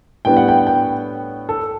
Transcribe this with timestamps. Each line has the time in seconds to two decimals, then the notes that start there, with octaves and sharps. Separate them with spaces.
0.25 A2 G3 B3 D4 G5
0.37 F#5
0.48 G5
0.67 G5
1.49 A4